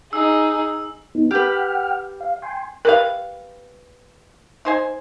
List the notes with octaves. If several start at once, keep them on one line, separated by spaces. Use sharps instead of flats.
D#4 G#4 E6
B3 D#4
G4 B4 F#5 G5 F6
F5
G5 G#5 C6
G4 A#4 B4 F5
D#4 C5 G#5